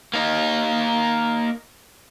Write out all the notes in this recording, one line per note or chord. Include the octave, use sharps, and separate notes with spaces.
A#3 D#4